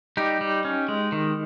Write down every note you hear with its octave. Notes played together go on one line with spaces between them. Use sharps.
G3 D#4 G4
G3
C#4
G#3
D#3